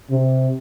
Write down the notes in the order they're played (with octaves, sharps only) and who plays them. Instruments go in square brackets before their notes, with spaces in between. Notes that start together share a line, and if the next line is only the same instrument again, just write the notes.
[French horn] C3